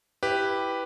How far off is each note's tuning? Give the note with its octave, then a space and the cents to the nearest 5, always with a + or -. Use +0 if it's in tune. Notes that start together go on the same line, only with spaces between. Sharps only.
E4 +0 G4 +0 B4 +0